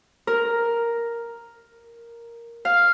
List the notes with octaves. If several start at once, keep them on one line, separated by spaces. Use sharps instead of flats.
A#4
F5